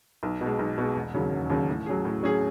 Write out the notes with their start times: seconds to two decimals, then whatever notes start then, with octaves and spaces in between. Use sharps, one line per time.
0.23 B1
0.41 B2 G#3
0.59 B1
0.78 B2 G#3
0.96 E1
1.14 D#2 C#3 F#3 C#4
1.32 E1
1.50 D#2 C#3 F#3 C#4
1.68 A2
1.86 F#3 C#4 G#4
2.05 A2
2.23 F#3 C#4 G#4